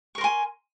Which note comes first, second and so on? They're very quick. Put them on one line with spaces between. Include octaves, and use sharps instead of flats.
C#6 A#4 C6 G#5